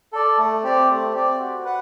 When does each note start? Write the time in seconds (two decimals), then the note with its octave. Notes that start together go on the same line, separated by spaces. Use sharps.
0.13 A4 D5
0.38 A3
0.63 C4 G4 D5
0.89 A3
1.14 C4 G4 D5
1.39 F#4
1.64 B4 F#5